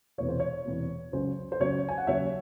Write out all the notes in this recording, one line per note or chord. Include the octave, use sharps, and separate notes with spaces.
E1 E2 C3 E3 C#5
C5
C#5
E1 E2 C3 E3
C#2 C#3 F#3 C5
C5
C#2 C#3 F#3 C#5
G#5
F#5
D#2 C#3 F#3 C#5 E5